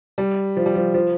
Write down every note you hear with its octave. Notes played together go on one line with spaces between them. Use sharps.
G3
F3
G3
F3
F3